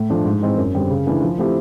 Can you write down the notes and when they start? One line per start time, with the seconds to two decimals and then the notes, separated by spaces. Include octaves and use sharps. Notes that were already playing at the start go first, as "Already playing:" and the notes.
Already playing: A2
0.10 F3 A3 D4
0.25 G#2
0.41 E3 G#3 C4 D#4
0.57 F#2
0.74 D3 G3 C4
0.90 C#3
1.06 E3 A3 D4
1.22 F3
1.38 A3 C4 E4 G4